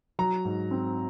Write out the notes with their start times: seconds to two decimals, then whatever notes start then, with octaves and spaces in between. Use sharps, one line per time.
0.19 F#3 A#5
0.45 G#2
0.71 C4